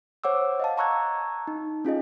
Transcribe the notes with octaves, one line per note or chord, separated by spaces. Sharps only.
C5 C#5 F#5 D6 E6
D#5 F5 A5
A5 A#5 C#6 E6 F#6 G#6
D#4
C#4 F4 G#4 D#5